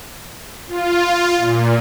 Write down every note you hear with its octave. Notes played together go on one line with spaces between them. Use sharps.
F4
A#2